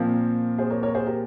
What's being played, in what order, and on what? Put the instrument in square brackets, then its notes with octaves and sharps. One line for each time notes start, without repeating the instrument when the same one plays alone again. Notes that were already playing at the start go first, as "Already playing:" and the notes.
Already playing: [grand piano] A#2 F3 C4 [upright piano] A#4
[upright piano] G#4 C5
A#4 C#5
A#4 C#5
G#4 C5
G4 A#4